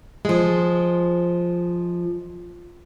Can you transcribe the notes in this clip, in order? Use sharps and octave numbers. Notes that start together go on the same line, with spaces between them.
F3 G#3